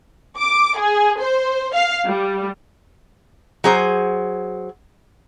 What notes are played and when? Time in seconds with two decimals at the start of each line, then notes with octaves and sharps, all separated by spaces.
0.37 D6
0.78 G#4
1.19 C5
1.74 F5
2.06 G3
3.64 F#3 G#4 C5